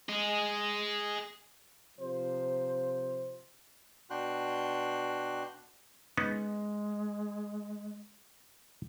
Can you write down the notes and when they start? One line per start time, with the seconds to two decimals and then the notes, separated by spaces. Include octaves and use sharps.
0.09 G#4 D#5
1.99 C3 F3 C5
4.10 B2 D4 F#4 G5 C6 F#6
6.17 G#3 B3 C#4 D#4